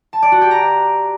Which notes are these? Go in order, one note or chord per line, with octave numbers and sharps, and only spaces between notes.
A5
D5
F#4
G4
A#5